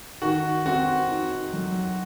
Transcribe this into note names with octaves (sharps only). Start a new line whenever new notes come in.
D#3 F#4
C4 F#4
D#4
F#3